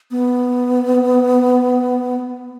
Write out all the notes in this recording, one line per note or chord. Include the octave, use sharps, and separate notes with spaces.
B3